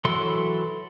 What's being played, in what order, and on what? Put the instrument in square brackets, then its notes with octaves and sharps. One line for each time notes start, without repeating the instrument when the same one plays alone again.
[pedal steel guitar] E3 F#3 E4 A4 C6